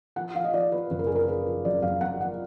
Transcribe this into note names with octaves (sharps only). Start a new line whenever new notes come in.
F3 F#5
F3 F5
D#5
F3 D5
F3 B4
F#1 B4
A#4
F3 G#4
A#4
F3 B4
F3
F#2 D5
F#2 F5
F#2 F#5
F3 F#5